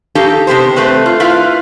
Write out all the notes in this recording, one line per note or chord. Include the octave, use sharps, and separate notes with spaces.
D#4 G4 A4 F5 A5 A#5
C3 B3 G4 C5
A3 C4 B4 C5
F4
E4 F4 B4 F5